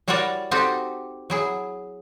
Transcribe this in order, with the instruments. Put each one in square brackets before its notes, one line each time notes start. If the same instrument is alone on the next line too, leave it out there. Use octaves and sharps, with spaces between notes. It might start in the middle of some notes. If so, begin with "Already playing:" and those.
[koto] G3 E4 F#4 A#4 C#5 D5
C4 D#4 F#4 G4 A4
F#3 E4 G#4